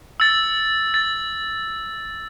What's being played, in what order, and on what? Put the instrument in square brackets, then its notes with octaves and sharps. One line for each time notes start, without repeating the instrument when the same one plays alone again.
[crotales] E6 A6
A6